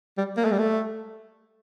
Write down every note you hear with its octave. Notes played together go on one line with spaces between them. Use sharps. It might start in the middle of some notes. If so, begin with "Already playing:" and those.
G3
A#3
A3
G3
A3